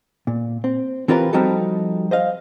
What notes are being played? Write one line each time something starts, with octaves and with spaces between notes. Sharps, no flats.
A#2
C4
E3 C4 F4 G4 A#4 B4
F3 G3 C4 D#4 F#4 A4
C5 D#5 F5